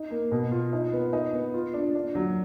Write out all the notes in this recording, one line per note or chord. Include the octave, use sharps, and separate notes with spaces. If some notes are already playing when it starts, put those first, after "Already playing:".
Already playing: D#4
A#3
B2
F4
D#4
B3
D#4
B3
F4
D4
D4
F#3